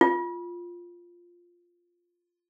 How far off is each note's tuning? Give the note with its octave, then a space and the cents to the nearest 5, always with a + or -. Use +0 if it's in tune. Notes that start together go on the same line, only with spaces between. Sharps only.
F4 +0